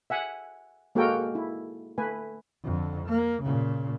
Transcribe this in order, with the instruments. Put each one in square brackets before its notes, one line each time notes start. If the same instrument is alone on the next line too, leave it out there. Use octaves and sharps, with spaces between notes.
[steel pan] E5 F#5 G#5
G#3 A#3 F#4 A4 A#4 G5
E4
A3 B4 G#5
[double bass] F2 D3
A#3
A#2 C#3